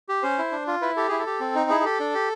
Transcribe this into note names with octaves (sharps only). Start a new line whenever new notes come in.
G4
C#4 C5
E4
D4
F4
E4 B4
G4 A4
E4 G#4
A4
G4
C4
D#4
E4 G#4
G#4
G4 A4
D4
G4